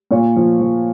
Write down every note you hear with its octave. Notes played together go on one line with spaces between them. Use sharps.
A#2 C#5
F3
F3